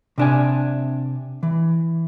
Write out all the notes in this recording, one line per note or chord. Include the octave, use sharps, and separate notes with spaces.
C3 D4 G#5
E3